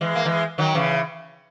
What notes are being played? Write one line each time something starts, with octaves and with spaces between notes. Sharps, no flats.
E3 G#3
A#3
E3 G#3
D#3 F#3
C#3 E3